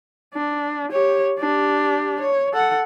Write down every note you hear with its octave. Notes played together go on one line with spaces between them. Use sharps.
D4
G4 C#5
D4 G4
C#5
A4 F#5